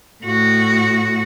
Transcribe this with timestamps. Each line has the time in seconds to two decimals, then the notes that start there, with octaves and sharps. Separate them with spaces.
0.24 A2 F#4